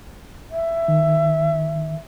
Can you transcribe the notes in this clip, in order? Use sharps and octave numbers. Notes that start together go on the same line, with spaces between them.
E5
D#3